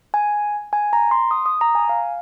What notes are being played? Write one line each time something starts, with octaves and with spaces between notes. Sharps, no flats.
G#5
G#5
A#5
C6
D#6
D#6
A#5
G#5
F5